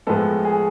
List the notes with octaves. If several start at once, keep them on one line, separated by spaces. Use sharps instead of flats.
A2 F3 G#3 B3 A4
G#4